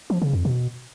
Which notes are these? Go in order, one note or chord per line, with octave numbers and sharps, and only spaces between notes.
F3
C#3
F2
B2